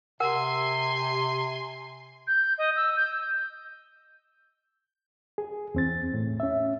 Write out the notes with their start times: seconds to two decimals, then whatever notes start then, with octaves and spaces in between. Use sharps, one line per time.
0.20 C3 A#4 F#5 G#5 C6
2.27 G6
2.58 D#5
2.76 E6
2.97 G6
5.38 G#4
5.75 E2 C4 A6
6.14 A2
6.40 C#4 E5